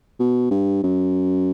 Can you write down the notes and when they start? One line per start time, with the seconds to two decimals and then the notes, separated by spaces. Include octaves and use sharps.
0.20 B2
0.51 G2
0.84 F#2